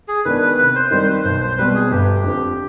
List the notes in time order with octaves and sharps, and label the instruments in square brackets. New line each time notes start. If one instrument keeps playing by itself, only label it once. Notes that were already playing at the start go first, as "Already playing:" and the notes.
[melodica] G#4
[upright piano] D#3 B3 D4 [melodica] B4
[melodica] B4
[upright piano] C3 [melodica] B4
[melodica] C5
[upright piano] D#3 G3 C4 [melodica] C5
[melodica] C5
B4
[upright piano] B1 [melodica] C5
[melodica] C5
[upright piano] B2 G3 C4 [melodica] B4
[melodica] G#4
[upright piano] G1 [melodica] G4
[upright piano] F2 D3